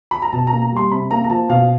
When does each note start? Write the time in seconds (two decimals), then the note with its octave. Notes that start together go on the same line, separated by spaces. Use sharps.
0.11 B5
0.22 A#5
0.33 B2 A5
0.47 A#5
0.53 A#3
0.62 A#5
0.72 G3 C6
0.91 C3 B5
1.11 A#3 A#5
1.24 A#5
1.30 F3 A5
1.49 B2 F5